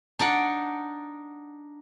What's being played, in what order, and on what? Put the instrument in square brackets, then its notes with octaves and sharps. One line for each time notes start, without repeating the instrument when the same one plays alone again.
[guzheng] D4 D#4 D5 F#5